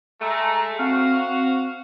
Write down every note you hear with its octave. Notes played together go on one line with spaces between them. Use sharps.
G#3 A3 A#5
C4 F#4 F5